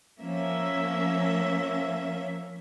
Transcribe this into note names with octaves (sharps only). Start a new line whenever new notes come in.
F3 A#3 C#4 E5